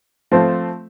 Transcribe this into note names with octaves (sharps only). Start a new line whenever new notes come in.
F3 A3 C4